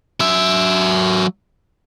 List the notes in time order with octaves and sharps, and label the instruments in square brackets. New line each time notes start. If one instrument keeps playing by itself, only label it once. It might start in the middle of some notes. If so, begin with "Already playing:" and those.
[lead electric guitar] F#3 E5